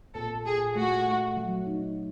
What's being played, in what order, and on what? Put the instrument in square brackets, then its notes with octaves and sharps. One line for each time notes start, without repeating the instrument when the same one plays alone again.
[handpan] A#2 [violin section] A4
[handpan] A#2 [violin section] G#4
[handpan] A3 [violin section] F#4
[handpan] A3
F#3
D#4